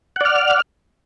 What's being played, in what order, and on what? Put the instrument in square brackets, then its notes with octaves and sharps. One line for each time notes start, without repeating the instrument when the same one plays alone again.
[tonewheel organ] F#5
D5
F6